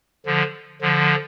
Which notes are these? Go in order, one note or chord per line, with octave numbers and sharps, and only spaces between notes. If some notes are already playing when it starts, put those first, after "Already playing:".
D3 F3
D3 F3